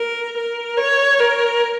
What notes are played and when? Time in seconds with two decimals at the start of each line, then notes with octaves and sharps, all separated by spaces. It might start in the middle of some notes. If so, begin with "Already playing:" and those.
Already playing: A#4
0.37 A#4
0.77 C#5
1.20 A#4